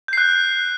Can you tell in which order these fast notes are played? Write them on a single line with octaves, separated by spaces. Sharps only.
G6 C7 F#6